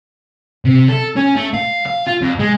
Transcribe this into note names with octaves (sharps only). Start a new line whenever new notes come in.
C3
A4
C#4
A3
F5
F5
F4
F2
G#3